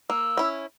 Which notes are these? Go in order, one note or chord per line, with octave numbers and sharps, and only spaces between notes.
A#3 E6
C#4 E4